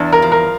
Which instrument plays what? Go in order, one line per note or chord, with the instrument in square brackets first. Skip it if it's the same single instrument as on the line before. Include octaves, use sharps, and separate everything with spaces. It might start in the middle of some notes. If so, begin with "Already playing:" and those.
Already playing: [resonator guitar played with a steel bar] E2 D4
[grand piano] A#4
[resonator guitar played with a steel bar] F3
[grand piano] A#4